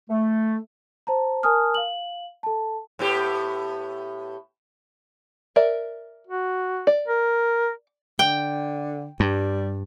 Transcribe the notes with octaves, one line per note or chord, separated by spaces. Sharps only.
A3
C5 A5 A#5
A#4 G#5 A5 D#6 F6
F5 F#7
A4 A5
A2 B3 G4
A#4 D5 E5
F#4
D5
A#4
D3 G5
G2 G3